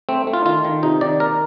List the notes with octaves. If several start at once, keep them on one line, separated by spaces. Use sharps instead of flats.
A3 C4
A3
F4
D#3 F4
D#3
C3 D#4
D#3 D5
A#3 A#4